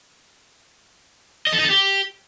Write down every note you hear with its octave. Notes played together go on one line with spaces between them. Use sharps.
D#5
A4
D#4
A4
G4